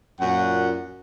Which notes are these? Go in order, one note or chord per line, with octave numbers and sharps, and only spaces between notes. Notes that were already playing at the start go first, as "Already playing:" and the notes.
F#2 A#2 F#5